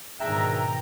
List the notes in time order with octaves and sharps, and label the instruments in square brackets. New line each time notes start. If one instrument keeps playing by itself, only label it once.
[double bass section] G#2 B2 D#3 [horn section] D4 G#4 E5 [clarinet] G5 [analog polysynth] A#5